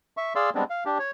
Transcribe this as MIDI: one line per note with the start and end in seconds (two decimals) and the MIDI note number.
0.17 0.33 76
0.17 0.33 85
0.35 0.50 68
0.35 0.50 74
0.35 0.50 77
0.35 0.50 84
0.35 0.50 88
0.55 0.64 55
0.55 0.64 56
0.55 0.64 59
0.55 0.64 60
0.55 0.64 62
0.70 0.84 77
0.85 0.98 62
0.85 0.98 67
0.99 1.11 73